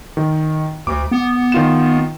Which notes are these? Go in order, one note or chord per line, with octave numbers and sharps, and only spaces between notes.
D#3
D2 D6
B3
D#3 F4 E7